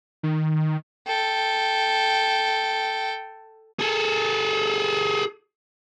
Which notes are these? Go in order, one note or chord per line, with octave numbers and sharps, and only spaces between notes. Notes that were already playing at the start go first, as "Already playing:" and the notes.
D#3
A4 G5
G#4 A4